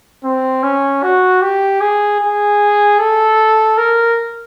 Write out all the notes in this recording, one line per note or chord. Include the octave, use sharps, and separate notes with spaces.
C4
C#4
F#4
G4
G#4
G#4
A4
A#4